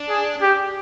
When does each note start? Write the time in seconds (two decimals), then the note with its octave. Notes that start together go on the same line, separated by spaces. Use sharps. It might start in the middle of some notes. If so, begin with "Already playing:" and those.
Already playing: D4
0.09 G#4
0.42 G4